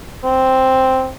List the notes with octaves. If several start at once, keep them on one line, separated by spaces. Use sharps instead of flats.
C4